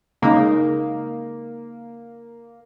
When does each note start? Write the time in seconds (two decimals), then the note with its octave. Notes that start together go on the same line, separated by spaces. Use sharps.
0.22 C#3 G#3 A#3 D#4